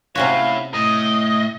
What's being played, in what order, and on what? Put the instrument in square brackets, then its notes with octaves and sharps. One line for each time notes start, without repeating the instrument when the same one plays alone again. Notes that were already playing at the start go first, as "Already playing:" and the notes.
[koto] C3 C#4 F#4 [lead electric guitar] E4 C#5 [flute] F5
[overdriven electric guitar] A2 [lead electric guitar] D#5 [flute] D#6